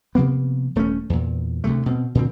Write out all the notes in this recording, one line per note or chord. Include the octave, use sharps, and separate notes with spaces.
C3 F3 A#3 B3
D#1 A3 C4 C#4
E2 A#2
D2 C3 G#3 A3
B2 C4
A#2 D3 F3 C4